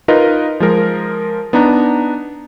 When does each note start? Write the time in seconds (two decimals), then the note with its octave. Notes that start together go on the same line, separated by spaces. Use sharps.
0.08 D#4 F4 A#4 B4 D#5
0.60 F3 G#3 A#4
1.53 B3 D4 D#4 A#5